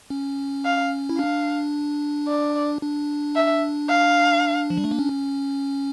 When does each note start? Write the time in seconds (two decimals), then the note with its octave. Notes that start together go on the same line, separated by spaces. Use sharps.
0.10 C#4
0.65 F5
1.09 E4
1.18 D4 F5
2.28 D5
2.82 D4
3.36 E5
3.89 F5
4.70 F3
4.77 G3
4.84 A3
4.91 A#3
4.99 C#4